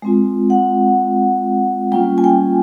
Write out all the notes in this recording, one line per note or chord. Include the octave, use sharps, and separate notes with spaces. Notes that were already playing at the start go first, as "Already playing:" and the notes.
G#3 C4 F4
F#5
G3 A#3 C#4 F4 G5
G#5
G5